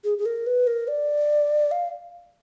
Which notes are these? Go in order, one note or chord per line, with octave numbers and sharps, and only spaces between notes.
G#4
G#4
A#4
B4
A#4
D5
F5